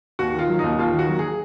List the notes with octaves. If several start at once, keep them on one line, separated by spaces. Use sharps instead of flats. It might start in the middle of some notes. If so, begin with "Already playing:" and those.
D#2 F#4
D#3
F4
F#3
D#2 D#4
D#2 F4
D#3
F#4
F#3
G#4